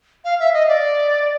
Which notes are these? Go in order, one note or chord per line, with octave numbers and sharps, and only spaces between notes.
F5
E5
D#5
D5